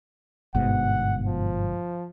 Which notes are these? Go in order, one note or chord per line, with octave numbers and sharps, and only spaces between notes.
G1 G#2 B2 F#5
F3